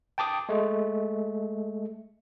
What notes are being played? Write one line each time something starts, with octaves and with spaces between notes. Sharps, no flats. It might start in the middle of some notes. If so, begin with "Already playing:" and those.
G5 A5 D6 D#6
G#3 A3